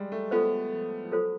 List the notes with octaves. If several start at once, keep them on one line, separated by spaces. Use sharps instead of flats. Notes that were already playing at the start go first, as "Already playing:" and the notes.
Already playing: G3 G#3
A3
B3 F4 A4 C5
F3
F3
F#3 F4 A4 C5